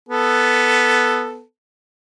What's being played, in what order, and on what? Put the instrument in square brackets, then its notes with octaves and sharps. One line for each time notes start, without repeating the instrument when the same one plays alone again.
[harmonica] B3 A4